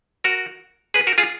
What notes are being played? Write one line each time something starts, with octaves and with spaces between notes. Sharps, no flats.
F#4 A#4
G#4 B4
F#4 A#4
F4 G#4